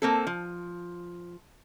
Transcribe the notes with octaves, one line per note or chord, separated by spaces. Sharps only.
A#3 C4 A4
F3